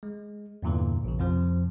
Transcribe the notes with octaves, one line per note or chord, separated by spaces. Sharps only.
G#3
E2 G2 A#2 D3 E3
A#1 C#3
F2 C3 F3